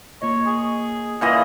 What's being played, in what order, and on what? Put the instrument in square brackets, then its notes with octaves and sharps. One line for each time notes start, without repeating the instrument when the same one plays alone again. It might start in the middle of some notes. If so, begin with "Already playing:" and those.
[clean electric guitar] A#3 F4 D#5 [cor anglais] C#5
[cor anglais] G#4
[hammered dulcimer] A#2 E3 D#5 [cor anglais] G#3 [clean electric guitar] F#5